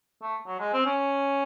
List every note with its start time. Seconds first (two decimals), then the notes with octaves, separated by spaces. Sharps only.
0.22 A3
0.47 F#3
0.60 G#3
0.73 C4
0.86 C#4